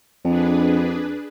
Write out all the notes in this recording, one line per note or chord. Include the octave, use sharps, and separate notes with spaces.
F2 D4 G#4 B4